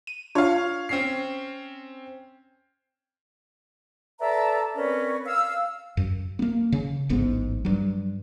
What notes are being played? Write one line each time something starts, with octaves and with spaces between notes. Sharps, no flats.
D#7
D4 F4 C#5 F5
C4 C#4 C7
A4 B4 D5 E5 A5 A#5
C4 C#4 A#4 B4 C#5 D5
F5 E6
F#2
A#3 B3
C#3
D1 A1 G#2 B3
G2 F#3